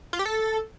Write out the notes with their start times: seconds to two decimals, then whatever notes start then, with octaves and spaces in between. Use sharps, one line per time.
0.13 F4
0.19 G4
0.26 A4